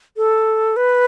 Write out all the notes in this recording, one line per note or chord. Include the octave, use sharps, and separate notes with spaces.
A4
B4